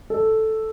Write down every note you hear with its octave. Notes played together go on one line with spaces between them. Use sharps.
A4